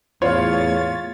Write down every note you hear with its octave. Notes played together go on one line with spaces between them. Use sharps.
E2 A2 F4 C#5 F5 A6